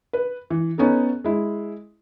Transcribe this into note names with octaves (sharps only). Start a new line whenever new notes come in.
B4
E3
B3 C#4 D#4 A4
G#3 E4